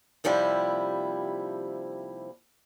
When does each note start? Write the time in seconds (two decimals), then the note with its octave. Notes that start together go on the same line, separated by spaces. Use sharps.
0.24 D#2 C3 F3 G3 E4